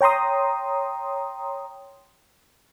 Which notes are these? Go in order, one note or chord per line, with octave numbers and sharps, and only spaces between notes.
C#5 G5 A#5 C6 D#6